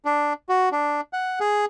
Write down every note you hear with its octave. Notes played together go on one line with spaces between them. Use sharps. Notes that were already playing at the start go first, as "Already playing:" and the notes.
D4
F#4
D4
F#5
G#4